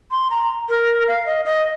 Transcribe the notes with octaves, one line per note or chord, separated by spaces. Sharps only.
C6
A#5
A#4
F5
D#5
D#5